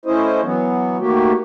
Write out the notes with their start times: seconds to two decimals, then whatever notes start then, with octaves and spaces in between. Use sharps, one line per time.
0.06 A3 C#4 E4 C5 D#5
0.43 E3 F#3 B3
0.99 D#3 A3 A#3 F#4 G4